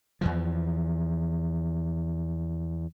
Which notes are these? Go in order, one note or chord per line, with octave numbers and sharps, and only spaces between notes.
E2 E3 F3